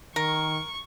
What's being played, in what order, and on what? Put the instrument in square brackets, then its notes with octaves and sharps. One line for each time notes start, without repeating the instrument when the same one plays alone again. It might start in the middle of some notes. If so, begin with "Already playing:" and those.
[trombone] D#3 [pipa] A#4 [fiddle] C#6